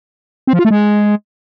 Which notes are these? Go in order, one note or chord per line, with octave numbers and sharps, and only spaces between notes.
C4
F3
F4
A3
G#3